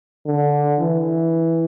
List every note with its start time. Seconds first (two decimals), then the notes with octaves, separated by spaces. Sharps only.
0.26 D3
0.81 E3